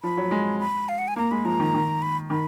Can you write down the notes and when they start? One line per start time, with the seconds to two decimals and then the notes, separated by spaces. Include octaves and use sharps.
0.03 F3 B5
0.17 F#3
0.31 G#3
0.60 B5
0.89 F5
0.98 F#5
1.08 G#5
1.16 A#3 A#5
1.31 G#3 B5
1.45 F3 A#5
1.60 D#3
1.74 D#3
2.02 B5
2.30 D#3 B5